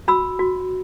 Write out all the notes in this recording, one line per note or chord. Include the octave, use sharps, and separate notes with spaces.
F#4 B5 E6
F#4